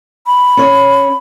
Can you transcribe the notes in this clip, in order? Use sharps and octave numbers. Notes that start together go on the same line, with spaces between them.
B5
C#4 C#5